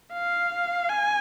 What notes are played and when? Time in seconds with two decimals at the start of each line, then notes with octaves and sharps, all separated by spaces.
0.13 F5
0.89 G#5